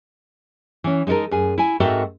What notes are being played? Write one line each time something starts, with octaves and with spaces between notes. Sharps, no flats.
E3 C#4
G#3 D#4 E4 A4 A#4
F#2 G#4
E4 G#5
G#2 C4 F#4 A4 A#4 E5